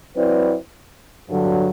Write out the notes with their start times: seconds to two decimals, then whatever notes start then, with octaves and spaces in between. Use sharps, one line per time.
0.15 F#3 C4 E4 B4 D5
1.29 G2 D3 F#3